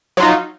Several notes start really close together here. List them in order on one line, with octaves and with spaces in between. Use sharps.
F#3 F4 D#4